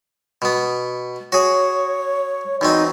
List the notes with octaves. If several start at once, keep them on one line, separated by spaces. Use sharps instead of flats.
B2 B3
F#4 G#4 C#5
E2 F#3 C4 D#4